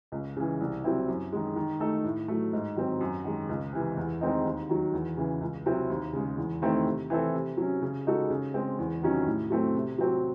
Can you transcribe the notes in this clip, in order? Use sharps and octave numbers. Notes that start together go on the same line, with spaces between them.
C#2
C#3 E3
C2
C3 F#3 C4 E4
F#2
D#3 G#3
D#3
A3 D#4 A4
A2
F#3 A3
G#2
D#3 F#3 C4
F#2
D#3 G#3
C#2
C3 E3
E2
D#3 G#3 C4 D#4
D#2
D#3 F#3
E2
C#3 E3
C#2
C3 F#3 C4 E4
D#2
C#3 G#3
E2
D#3 A3 C4 E4
C3
E3 C4 E4 A4
C3
F#3 C#4
C#3
G#3 D#4 F#4 A4
C#3
G#3 C4
E2
C3 D#3 F#3 C#4
A2
F#3 A3 C4
C3
F#3 C4 F#4